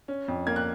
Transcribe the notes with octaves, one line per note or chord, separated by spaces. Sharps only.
C#4
F2
A#3 G#6
F#6